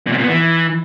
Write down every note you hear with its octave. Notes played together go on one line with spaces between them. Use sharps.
A#2
C3
A#2
B3
E3